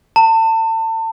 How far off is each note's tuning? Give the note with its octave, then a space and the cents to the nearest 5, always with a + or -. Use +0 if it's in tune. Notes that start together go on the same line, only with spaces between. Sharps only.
A5 +35